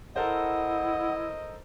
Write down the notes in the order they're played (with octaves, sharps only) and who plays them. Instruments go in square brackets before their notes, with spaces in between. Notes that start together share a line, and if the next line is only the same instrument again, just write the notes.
[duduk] E4 [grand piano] A4 A#4 C5 [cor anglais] D#5 [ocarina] F#5